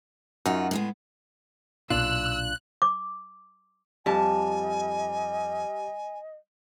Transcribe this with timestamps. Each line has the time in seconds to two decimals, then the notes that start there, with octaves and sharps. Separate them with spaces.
0.46 F#2 D#4 F4 F#4
0.71 A2 G#3 B3
1.90 B1 A#2 D4 F4 E6 F#6
2.82 D6
4.06 F2 G3 D#5 G#5 A5